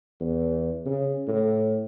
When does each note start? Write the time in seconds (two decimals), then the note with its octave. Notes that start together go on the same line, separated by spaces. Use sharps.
0.21 E2
0.86 C#3
1.28 A2